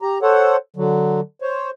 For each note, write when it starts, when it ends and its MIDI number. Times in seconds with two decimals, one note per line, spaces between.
0.02 0.18 67
0.02 0.18 82
0.22 0.56 69
0.22 0.56 72
0.22 0.56 73
0.22 0.56 78
0.76 1.20 50
0.76 1.20 54
1.42 1.70 72
1.42 1.70 73